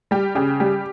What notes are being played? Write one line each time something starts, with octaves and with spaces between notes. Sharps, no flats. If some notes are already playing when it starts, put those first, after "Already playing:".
G3 G4
C#3 G4
G3 G4